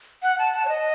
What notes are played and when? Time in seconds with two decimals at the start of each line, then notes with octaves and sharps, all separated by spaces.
0.23 F#5
0.39 A5
0.53 A5
0.65 C#5
0.69 D#5